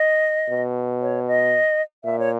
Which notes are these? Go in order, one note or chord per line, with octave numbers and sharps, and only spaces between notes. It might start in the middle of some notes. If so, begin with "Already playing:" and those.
Already playing: D#5
B2
C#5
D#5
A#2 E5
C#5